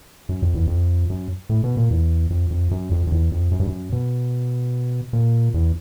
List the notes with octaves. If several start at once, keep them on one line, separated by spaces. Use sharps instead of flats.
F#2
F2
E2
F2
F#2
A2
B2
A#2
E2
F2
F2
F#2
F2
F2
E2
F2
F#2
G2
F#2
B2
A#2
E2